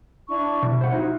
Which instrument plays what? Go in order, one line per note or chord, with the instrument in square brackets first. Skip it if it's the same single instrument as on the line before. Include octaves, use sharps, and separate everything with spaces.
[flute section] D4 E4 C#6
[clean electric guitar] B2 [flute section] E4
[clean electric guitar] C5 F#5
D#4 F4 F#4